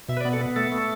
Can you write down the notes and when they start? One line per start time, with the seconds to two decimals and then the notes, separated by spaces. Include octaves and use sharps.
0.09 B2 E5
0.17 B4
0.20 D5
0.25 B3
0.33 A4
0.41 B3
0.56 A3 A4
0.72 A3